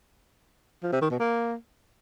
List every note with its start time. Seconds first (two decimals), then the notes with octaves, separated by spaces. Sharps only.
0.83 F3
0.92 C3
1.01 D#3
1.11 B2
1.20 A#3